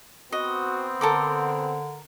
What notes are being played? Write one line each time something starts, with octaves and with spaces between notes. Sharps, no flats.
B3 C4 F#4 D#5
D3 A4 A#4 D6